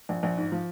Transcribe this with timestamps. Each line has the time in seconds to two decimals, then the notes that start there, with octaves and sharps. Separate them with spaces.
0.09 A#1
0.23 A#1
0.37 G#2
0.52 F3